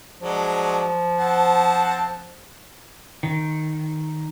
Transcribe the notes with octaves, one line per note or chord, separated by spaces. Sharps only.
F3 F#3 G#3 D4
C4 F#5 A5
D#3